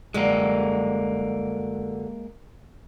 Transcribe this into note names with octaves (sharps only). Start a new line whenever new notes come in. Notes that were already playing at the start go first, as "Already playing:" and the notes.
F#2 D3 G3 G#3 A#3